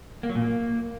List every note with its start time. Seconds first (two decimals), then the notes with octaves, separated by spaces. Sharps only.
0.23 A#3
0.29 F#3
0.35 A#2
0.42 A#3